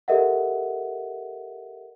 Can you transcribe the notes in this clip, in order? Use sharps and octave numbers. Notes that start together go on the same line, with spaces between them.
G4 A4 A#4 D#5 E5 F#5